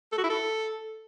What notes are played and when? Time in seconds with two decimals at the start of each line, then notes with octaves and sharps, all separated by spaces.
0.12 A4
0.18 F#4
0.24 E4
0.30 A4